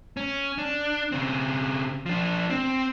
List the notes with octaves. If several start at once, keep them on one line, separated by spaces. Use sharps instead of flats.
C#4
D4
C#3 C4
F3 D4
C4